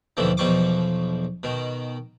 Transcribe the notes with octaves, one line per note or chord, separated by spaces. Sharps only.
D#2 B2 D3 E3 F3
B1 E2 B2 F3 C#6 D6
B2 D#3